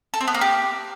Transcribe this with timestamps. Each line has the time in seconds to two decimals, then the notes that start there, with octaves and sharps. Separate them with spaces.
0.14 A4
0.21 C4
0.28 B3
0.34 A#3
0.41 G4